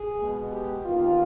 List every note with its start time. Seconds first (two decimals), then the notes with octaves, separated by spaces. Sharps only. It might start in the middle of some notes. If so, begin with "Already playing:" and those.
Already playing: G#4
0.17 B2 G#3 B3
0.51 G4
0.85 D#2 D#3 B3 F4